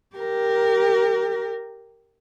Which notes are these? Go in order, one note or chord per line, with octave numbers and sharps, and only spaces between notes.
G4 A#4